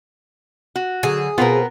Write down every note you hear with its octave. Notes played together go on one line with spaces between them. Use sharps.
F#4
D3 F#3 G#4
B2 B3 C4 F4 A#4